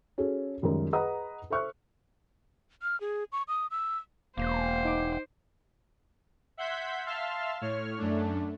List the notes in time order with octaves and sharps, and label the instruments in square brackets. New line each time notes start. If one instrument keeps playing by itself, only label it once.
[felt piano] C#4 F#4 G#4 A4
C#2 F#2 D#3 G3 A#4
G#4 B4 D#5 F#5 A#5 D#6
A4 C5 E5 C#6 F6 F#6
[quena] F6
G#4
C#6
D#6
E6
[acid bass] E1 [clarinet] A#3 [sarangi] C5
[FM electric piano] D#4 D6
[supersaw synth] E5 F#5 C6 G6 G#6 B6
E5 F5 A5 C6 E6 F6
A2 C#5 F6
F#2 A3 D4